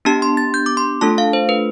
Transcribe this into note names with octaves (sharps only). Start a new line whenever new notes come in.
B3 D4 G4 A5
C6
A6
G6
D6
C6
A3 D4 F4 A4 A5
F5
C5
B4